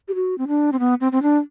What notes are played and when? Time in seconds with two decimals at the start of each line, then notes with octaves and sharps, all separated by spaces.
0.08 G4
0.15 F#4
0.38 C4
0.48 D4
0.72 C4
0.79 B3
1.01 C4
1.12 C4
1.23 D4